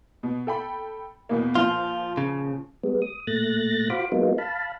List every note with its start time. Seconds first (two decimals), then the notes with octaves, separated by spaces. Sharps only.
0.23 B2
0.47 A4 G5 B5
1.29 E2 B2 A#3
1.55 A#2 F3 F4
2.17 C#3
2.83 G3 G#3 B3
3.02 D#6
3.27 A#2 A3 F#6 A6 A#6
3.90 F4 F#4 C5 F5 B5 D6
4.12 F#3 G#3 A#3 B3 D#4 F4
4.38 F5 A5 B5